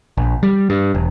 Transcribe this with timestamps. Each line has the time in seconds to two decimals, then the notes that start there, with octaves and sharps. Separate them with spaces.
0.17 A#1
0.43 G3
0.70 G2
0.95 E1